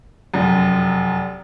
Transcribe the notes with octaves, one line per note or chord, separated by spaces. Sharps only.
F1 F#2